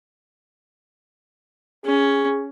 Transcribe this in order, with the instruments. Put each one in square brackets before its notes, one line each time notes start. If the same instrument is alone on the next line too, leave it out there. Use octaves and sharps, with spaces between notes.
[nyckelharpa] C#4 [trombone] G#4